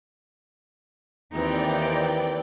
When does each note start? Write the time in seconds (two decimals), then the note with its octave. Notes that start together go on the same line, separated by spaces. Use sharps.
1.33 D#2 E3 C4 D#4 D5 G5